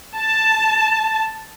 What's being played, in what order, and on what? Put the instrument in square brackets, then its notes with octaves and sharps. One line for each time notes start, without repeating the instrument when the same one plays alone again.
[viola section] A5